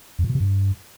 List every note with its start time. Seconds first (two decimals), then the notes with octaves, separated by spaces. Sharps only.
0.19 F2
0.24 A#2
0.30 B2
0.35 C3
0.40 G2